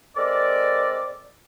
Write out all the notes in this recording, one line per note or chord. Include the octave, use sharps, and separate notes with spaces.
G#3 C4 A4 A#4 D5